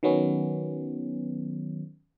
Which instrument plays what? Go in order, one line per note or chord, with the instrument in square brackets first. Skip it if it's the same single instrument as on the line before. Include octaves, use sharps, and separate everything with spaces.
[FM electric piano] D#3 F#3 B3 C#4